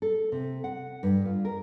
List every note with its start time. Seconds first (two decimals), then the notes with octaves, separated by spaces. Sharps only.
0.02 A4
0.32 C3
0.64 F#5
1.03 G2
1.25 F4
1.45 A#4